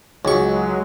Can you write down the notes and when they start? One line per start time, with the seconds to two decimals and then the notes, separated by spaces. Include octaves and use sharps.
0.25 C#2 F#3 G#3 D#4 F#4 C#6